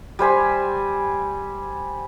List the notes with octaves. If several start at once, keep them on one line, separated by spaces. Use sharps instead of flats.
G3 C5 G#5 B5